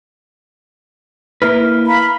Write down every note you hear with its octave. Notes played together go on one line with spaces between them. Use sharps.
A#3 E4 B4 F6
F5 A#5 B5